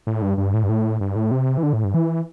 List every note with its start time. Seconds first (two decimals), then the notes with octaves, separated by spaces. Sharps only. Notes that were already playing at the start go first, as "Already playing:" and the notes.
0.07 A2
0.22 G2
0.37 G2
0.54 A2
0.63 G2
0.69 A2
1.00 G2
1.16 A2
1.31 C3
1.57 E3
1.63 D3
1.73 A2
1.84 G2
1.94 E3